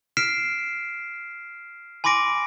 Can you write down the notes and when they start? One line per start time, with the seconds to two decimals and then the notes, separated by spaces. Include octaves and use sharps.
0.17 F6 B6 C7 D7 E7
2.04 G#5 B5 C6 D6 A#6 D7